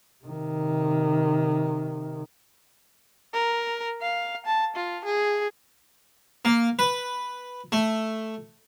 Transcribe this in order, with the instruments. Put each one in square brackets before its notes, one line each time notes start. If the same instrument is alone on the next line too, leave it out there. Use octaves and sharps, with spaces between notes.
[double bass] C3 D#3
[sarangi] A#4
F5
A5
F4
G#4
[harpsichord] A#3
B4
A3